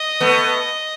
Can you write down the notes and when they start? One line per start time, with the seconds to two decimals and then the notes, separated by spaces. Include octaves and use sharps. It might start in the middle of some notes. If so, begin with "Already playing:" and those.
Already playing: D#5
0.20 A3 B3